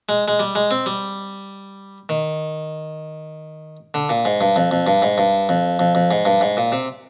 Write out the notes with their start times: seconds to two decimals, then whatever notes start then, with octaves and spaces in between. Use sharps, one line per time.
0.09 G#3
0.28 G#3
0.39 G3
0.55 G#3
0.71 C4
0.86 G3
2.09 D#3
3.94 D3
4.10 A#2
4.25 G#2
4.41 G2
4.56 F2
4.71 F2
4.87 G2
5.02 G#2
5.18 G2
5.49 F2
5.79 F2
5.95 F2
6.11 G#2
6.25 G2
6.41 G#2
6.57 A#2
6.72 C3